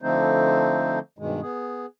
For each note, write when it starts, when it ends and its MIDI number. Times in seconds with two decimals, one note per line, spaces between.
0.02 0.99 50
0.02 0.99 53
0.02 0.99 57
0.02 0.99 60
0.02 0.99 63
0.02 0.99 72
1.18 1.41 43
1.18 1.41 47
1.18 1.41 51
1.18 1.41 56
1.42 1.86 59
1.42 1.86 68